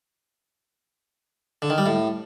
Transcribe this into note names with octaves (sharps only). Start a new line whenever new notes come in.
D3
D#3
G3
A2